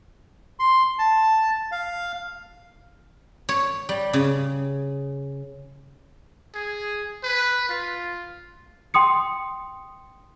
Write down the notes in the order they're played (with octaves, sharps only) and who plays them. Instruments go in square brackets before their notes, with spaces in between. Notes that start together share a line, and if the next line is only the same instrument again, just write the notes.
[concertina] C6
A5
F5
[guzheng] C#5
G3
C#3
[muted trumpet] G#4
B4
F4
[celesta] G5 C6 D#6 C#7